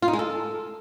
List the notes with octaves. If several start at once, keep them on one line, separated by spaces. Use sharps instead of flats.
F4
D#4
G#3
A4